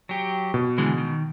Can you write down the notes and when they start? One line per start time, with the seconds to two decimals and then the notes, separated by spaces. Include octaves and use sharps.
0.09 F#3 G4
0.54 B2
0.78 D3 E3 G#3
0.98 D#3